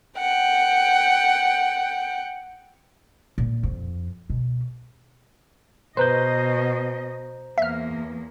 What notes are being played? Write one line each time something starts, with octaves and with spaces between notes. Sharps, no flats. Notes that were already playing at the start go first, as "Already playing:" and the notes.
F#5 G5
A#2
F2
B2
B2 B4 C5 D#5 A#5 G6
E2 A#3 E5 F6